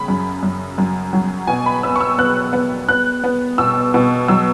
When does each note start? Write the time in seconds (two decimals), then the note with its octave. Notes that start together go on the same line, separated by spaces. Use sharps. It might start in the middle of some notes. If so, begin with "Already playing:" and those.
Already playing: C#3 B5
0.08 F#2
0.43 F#2
0.78 F#2
1.13 F#3
1.47 B2 G#5
1.66 B5
1.83 B3 E6
1.96 C#6
2.01 E6
2.18 B3 F#6
2.53 B3
2.89 B3 F#6
3.24 B3
3.58 B2 E6
3.94 B2
4.28 F#3 E6